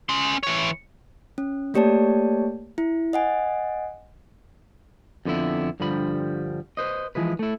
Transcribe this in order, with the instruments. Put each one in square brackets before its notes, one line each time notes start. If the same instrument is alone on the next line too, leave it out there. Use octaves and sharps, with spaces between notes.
[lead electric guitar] C#4 C6
E3 C#5
[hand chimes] C#4
A3 A#3 G4 C#5 D5 A5
E4
D#5 F#5 G#5
[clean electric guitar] F2 D3 B3 E4
G2 D3 F3 G3 B5
B4 C5 D#5
E3 F3 G#3 B4
A3 E4